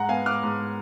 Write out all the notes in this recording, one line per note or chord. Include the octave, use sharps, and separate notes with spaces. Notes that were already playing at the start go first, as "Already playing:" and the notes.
Already playing: G#2 F#5 A#5
B3 F5 G#5
G#2 D6 F6
G#2